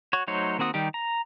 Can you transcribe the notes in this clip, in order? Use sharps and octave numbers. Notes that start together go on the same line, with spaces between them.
F#4 C#5
F#3 A3 D#4 C5 C#5
D#3 A#3 C4 F#4 D#6
D#3 G3 D#4 G4
A#5